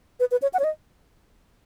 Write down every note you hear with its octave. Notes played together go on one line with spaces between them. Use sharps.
B4
B4
C#5
F#5
C#5
D#5